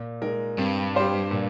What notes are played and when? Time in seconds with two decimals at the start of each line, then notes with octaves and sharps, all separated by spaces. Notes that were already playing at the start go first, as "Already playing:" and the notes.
Already playing: A#2
0.21 G#3 D#4 A#4
0.58 G2 C4
0.95 G4 C5 F5
1.31 A#2